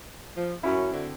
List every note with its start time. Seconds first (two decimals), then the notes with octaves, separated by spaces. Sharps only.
0.36 F3
0.63 F#2 C#4 E4 F#4 B5
0.92 D3 C4